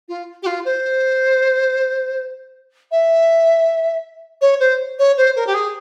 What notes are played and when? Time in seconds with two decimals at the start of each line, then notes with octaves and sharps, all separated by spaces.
0.08 F4
0.42 G4
0.46 F4
0.65 C5
2.91 E5
4.41 C#5
4.60 C5
4.98 C#5
5.17 C5
5.35 A#4
5.46 G4
5.54 G#4